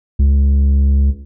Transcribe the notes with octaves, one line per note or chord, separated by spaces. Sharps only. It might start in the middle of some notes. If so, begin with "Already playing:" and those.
C#2